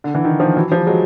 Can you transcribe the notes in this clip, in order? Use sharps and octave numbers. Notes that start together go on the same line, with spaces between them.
D3
D3 E3
D#3
D#3 F3
E3 F#3
F3 G3
F#3 G#3